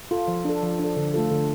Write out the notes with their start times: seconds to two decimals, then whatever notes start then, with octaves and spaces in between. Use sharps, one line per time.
0.11 F4 A4
0.28 F3
0.45 D4 A4
0.63 F3
0.79 D4 A4
0.97 D3
1.14 A3 F4 A4
1.31 D3